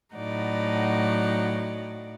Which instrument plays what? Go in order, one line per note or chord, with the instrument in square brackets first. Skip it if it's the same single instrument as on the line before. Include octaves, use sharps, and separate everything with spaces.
[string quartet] A2 F#3 D#4 D5 F#5